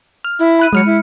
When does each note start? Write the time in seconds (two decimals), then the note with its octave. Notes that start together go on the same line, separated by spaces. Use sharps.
0.24 F6
0.39 E4
0.59 B5 F#6 D#7
0.73 F#3 G#3 F6 C#7
0.86 E4